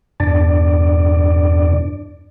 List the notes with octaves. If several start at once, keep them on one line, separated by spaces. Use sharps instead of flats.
E2 G2 B2 D4 D5